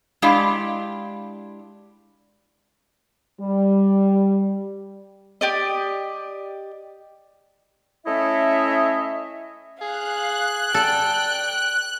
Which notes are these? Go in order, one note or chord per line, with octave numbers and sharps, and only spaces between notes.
G#3 D4 E4 G4 F5
G3
G4 D5 D#5
A3 C#4 E4 C#5 D#5 E5
G#4 F5 F#6
A4 D5 G5